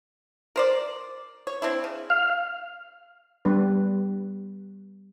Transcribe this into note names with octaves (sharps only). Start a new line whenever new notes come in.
A#4 C5 D5
C#5
C4 D4 E4
C#3
F5
G3 B3 D4 B4